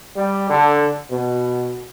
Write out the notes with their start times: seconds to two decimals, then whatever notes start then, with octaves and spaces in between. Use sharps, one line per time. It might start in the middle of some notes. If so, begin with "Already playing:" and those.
0.17 G3
0.50 D3
1.11 B2